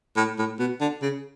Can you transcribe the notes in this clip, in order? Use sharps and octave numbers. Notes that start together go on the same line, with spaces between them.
A2
A2
B2
D3
C#3